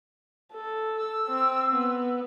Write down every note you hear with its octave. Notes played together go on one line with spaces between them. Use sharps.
A4
E6
C4
B3